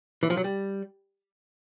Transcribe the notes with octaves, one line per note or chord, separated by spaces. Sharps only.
E3
F3
F#3
G3